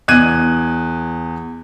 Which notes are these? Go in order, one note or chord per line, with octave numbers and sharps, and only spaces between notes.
E2 F#6 G#6 D#7